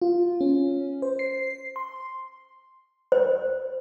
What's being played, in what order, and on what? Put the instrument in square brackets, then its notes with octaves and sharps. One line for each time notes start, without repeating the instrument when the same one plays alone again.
[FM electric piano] F4
C#4
C5
C7
C6
[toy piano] C5